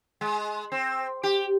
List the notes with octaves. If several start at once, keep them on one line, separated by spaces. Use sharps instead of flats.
G#3
C4
G4